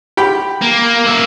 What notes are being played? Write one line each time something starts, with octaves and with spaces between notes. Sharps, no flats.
G4 G5 B5
A#3
A#3 E5